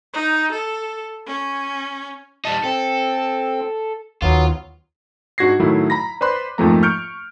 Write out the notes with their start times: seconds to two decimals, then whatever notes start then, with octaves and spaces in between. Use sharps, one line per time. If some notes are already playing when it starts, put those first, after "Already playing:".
0.14 D#4
0.52 A4
1.27 C#4
2.45 G3 D#4 A5
2.64 C4 A4
4.22 D#2 F#3 B3 F4
5.38 G#2 D4 F#4 G#6 A#6 C7
5.59 A2 D#3 F#3 A3 E4
5.90 A#5 B5 A#6
6.21 B4 C5 D5 B5 C6 F#6
6.58 F2 G#2 F3 A3 A#3 A#5
6.82 C#6 F6 G6 C#7 D7